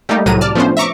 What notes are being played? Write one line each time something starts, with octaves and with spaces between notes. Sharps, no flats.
G3 A3 A#3 D#4 G4
C2 A2 C3 F#3 A#5 D#7
D5 A5 F6
F3 A3 B3 C#4 D4 C5
E5 A#5 C#6 D6